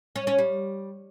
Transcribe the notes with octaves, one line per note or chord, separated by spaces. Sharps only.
C#4
C#4
G3